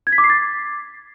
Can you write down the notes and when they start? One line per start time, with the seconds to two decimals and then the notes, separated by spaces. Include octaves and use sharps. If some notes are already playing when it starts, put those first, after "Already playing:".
0.07 G#6
0.12 B6
0.18 D6
0.24 C7
0.30 A6